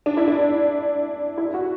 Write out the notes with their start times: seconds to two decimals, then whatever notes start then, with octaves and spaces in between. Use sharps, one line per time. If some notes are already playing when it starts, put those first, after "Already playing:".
0.06 D4
0.17 E4
0.28 D4
1.38 E4
1.54 F#4